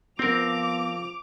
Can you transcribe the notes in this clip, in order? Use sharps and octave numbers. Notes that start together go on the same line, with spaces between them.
F3 B3 C4 A#4 D6 F7